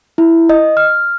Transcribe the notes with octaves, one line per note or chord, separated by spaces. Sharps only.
E4
D#5
F6